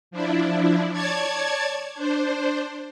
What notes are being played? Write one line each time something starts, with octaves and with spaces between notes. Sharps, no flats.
F3 D4 E4
C#5 D5 A5 G#6
D4 C5